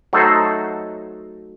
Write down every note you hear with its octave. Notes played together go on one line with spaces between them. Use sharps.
F#3 A3 D#4 A4 C5